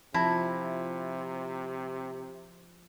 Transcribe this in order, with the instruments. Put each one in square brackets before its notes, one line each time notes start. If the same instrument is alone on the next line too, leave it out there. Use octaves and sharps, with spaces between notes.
[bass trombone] C3 [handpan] F3 [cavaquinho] E4 [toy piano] E5 A5